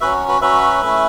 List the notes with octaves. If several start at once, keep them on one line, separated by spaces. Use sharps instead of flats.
F#3 C#4 F#4 B4 E5
F#4 B4
F#3 C#4 F#4 B4 E5
A3 C#4 E4